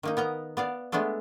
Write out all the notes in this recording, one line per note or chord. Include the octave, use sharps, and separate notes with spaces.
D#3 A#3 D#4
B3 A#4 D#5 A#5
B3 D5 F5
G#3 A3 B3 D4 A4